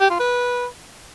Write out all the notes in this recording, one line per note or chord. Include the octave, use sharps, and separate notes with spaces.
G4
F4
B4